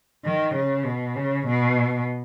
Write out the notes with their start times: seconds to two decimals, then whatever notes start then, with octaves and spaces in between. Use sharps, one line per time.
0.25 D#3
0.55 C#3
0.85 B2
1.16 C#3
1.47 B2